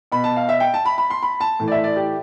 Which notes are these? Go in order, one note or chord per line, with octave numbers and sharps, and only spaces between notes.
B2 B5
A5
F5
E5
G5
A5
B5
B5
C6
B5
A5
A2 E3
D5
E5
D5
G4